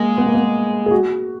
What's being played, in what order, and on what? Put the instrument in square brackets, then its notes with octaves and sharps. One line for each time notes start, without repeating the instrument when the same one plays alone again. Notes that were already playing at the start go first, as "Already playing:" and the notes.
Already playing: [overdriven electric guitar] G#3 [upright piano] A#3
[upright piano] B3
A#3
B3
G#4
F#4